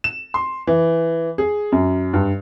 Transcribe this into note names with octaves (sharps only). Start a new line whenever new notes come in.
E7
C6
E3
G#4
F#2
G2